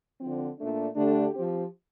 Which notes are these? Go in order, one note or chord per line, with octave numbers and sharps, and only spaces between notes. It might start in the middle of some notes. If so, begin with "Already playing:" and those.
D3 F3 C4
A#2 A3 D4
D3 A3 D4 G4
F3 C4 G4